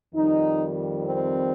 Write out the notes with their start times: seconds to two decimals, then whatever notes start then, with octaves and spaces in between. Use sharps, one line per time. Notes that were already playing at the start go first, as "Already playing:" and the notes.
0.14 F2 D#3 G3 D#4
1.05 C4